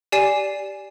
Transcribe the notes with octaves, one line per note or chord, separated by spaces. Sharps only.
G4 D5 G#5 C7 E7